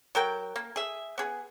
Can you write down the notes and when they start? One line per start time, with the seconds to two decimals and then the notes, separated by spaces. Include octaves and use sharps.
0.15 F#3 A#4 G5
0.56 A#3
0.76 G#4 E5
1.18 B3 G#4